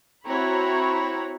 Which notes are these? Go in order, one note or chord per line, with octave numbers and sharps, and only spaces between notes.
C4 E4 F#4 C#5 A#5 B5